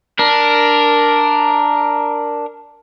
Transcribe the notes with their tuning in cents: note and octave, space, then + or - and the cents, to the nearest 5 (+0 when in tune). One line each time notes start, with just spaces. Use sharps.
D4 +0 A#4 +0